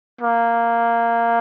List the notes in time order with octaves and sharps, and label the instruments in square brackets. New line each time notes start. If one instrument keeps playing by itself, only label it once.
[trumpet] A#3